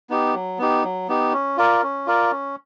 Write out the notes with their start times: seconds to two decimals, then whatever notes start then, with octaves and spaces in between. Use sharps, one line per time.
0.10 B3 D#4 G4
0.34 F#3
0.58 B3 D#4 G4
0.83 F#3
1.08 B3 D#4 G4
1.33 C#4
1.57 F4 A#4 D5
1.83 C#4
2.07 F4 A#4 D5
2.31 C#4